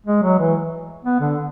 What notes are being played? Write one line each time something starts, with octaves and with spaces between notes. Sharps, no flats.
G#3
F#3
E3
B3
D3